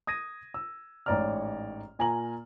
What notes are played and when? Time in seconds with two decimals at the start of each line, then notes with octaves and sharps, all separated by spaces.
0.07 D#6 G#6 A#6 D#7
0.54 E6
1.06 A1 G#2 C#5 D5 A#5 F6
1.99 A#2 G#5 A#5 F#7